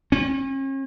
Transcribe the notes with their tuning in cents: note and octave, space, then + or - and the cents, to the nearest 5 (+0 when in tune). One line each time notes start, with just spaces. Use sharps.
C#4 -40